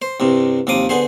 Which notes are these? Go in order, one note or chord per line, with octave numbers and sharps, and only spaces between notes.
C5
C2 G2 C3
D#2 C3 F3 D6 D#6
D3 B3 G#4 C5